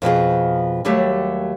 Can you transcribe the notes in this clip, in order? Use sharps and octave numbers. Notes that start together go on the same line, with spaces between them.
F2 B2 F3 G#4
D#2 F#3 G3 A3 G4 D5